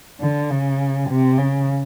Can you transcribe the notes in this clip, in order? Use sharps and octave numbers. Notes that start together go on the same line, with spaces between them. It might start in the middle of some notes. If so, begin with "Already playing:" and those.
D3
C#3
C3
C#3